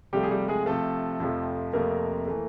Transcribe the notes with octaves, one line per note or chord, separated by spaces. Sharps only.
C3 F3 G3 A3 G4
G#4
G3 G4
G#3 G#4
C3 F3 A3 A4
F2 C3 F3 A3
F2 C3 F3 A3 A#3 A#4
E3 A3